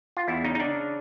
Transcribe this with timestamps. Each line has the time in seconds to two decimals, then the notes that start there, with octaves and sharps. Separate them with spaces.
0.17 F4
0.28 E2 E4
0.44 C#3 D#4
0.55 D#4
0.60 C#3 D4